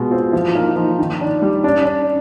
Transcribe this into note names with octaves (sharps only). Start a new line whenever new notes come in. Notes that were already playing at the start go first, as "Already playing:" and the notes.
Already playing: B2 G#3 F4 F#4
C4 F4
F3 E4
A#3 D#4
F3 D#4
D#3
D4
G3
C#4 D4
D4